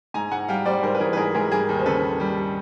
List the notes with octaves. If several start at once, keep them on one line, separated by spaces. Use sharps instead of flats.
G#2 G#5 A#5
G#2 F#5 G#5
G3 F5 G5
G3 C5 D5
G#2 A#4 C5
B4
E3 G#4 A#4
B4
G#2 G#4 A#4
G#2 G#4 A#4
G3 G#4 A#4
D#2
C5
C#3 A4 B4
D#2
G3